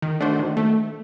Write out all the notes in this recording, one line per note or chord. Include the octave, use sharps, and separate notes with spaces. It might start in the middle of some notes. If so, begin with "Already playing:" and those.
D#3
A3 D4 F#4 C5
D#3
A3